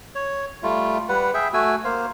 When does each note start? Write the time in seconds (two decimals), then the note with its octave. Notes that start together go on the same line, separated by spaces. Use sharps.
0.15 C#5
0.63 G3 A3 F4
1.09 G3 B4 F#5
1.34 G#4 E5 G5
1.53 A3 F#4 G#5 E6
1.84 A#3 C5 F5